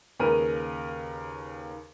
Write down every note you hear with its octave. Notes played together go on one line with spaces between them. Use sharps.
D#2 C#3 A#4 B4 D#7